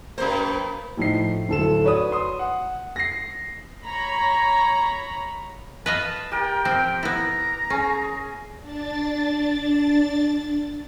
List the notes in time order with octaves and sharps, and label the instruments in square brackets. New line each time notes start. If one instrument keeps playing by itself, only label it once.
[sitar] F#2 C5 [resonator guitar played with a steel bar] A#3 B4
[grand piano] A2 F3 D#4 C7
D1 A4 E7
F#4 B4 C#5 D5 D#6
C6 D#6
F#5
A#6 C7
[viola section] C#5 A#5 B5
[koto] B4 D#5 F5 [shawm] A5
[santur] G4 A#4 [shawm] G5
[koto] F3 C4
[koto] B3 E4 [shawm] A#5
[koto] C#4 [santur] G#4
[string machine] D4 A6